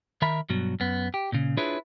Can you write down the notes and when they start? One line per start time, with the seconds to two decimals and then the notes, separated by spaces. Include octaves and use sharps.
0.22 D#3 A#4 E5 A#5 B5
0.50 G2 B2 F#3
0.80 F#2 B3
1.14 G4
1.32 A#2 C#3
1.57 D4 E4 F4 G#4 B4 C#5